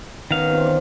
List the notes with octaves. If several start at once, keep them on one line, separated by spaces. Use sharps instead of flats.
D#3 B3 C#4 F5
C3 F4
E3 D5